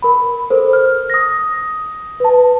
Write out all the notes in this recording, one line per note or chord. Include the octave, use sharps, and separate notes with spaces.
A#4 B5
A4 A#4 C5
F6
D#6 A#6
B4 A5